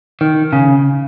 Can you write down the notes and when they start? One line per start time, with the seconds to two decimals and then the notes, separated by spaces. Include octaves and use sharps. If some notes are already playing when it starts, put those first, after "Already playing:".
0.21 D#3
0.53 C#3